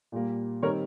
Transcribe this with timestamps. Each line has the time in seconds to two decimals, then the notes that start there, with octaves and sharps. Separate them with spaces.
0.12 A#2 G3 A#3
0.63 D#3 G3 C4 A#4 C#5